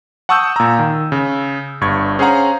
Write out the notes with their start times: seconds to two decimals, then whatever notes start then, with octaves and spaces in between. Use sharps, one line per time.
0.29 F#5 A5 C#6 D#6 E6 G6
0.56 A#2 A#5
0.79 D#3
1.12 C#3
1.81 G1 G2 C#6 G#6
2.19 C#4 G#4 C5 F5 F#5 A#5